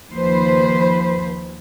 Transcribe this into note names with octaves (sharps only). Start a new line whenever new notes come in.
D#2 F3 B4 C5